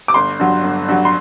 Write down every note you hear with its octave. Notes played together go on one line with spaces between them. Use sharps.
D6
G1 C6
G2 F#3
G1
G2 F#3
C6